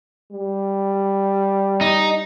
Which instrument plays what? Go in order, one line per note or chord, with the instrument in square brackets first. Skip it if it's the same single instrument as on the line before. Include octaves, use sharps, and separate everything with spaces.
[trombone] G3
[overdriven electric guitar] D#4